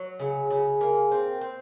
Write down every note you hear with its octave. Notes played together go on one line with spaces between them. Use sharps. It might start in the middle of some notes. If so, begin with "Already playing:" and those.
Already playing: F#3
C#3
C#3
A#3
C4
C4